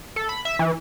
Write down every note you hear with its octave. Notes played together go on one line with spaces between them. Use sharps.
A4
B5
E5
E3